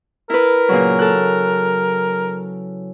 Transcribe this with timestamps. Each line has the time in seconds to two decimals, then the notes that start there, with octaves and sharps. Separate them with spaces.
0.30 E4 A#4 B4
0.69 A#2 C#3 F#3
0.99 A4 F#6